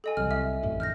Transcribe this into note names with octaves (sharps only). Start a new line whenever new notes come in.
A4 D#5 G#5
C2 C3 F#3 F6
E5
A1 F#2 A2
D#3 F6 G6 A#6